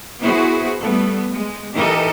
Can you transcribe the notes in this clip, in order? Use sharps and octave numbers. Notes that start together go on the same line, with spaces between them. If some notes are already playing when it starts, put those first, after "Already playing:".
B3 E4 F#4 G#4 C5
G3 A3 B3 A4
G#3
E3 D#4 G4 A4 A#4 D#5